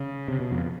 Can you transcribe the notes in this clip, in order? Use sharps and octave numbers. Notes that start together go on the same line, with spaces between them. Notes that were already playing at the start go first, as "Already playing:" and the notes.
Already playing: C#3
C3
B2
F2